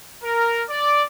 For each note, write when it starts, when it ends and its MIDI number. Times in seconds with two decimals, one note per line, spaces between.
0.24 0.62 70
0.70 1.04 74